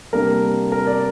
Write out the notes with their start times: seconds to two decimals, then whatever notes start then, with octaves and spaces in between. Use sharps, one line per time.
0.13 C3 G3 A#3 D4 A#4
0.72 A#4
0.87 D5